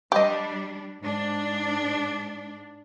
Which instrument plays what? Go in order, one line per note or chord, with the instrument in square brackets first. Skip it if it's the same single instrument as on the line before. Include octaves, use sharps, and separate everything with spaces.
[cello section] G3 D4 [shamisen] G4 D#5
[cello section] G#2 D4